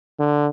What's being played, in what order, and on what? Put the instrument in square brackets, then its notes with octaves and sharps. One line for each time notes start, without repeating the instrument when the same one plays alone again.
[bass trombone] D3